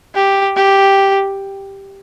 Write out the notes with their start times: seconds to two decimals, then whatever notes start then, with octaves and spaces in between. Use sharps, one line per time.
0.15 G4
0.56 G4